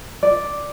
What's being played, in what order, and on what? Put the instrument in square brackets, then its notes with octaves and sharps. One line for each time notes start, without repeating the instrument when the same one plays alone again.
[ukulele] D5